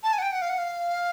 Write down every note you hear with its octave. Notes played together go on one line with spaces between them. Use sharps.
A5
G#5
F#5
G5
F#5
F5
F#5
F5